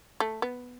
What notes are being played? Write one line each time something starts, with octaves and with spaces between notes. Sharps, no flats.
A3
B3